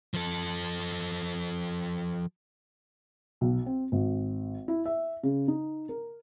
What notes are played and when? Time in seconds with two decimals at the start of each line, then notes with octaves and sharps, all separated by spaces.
0.14 F3 A4
3.41 B1
3.66 C4
3.92 G#1
4.68 E4
4.85 E5
5.23 C#3
5.48 D#4
5.89 A#4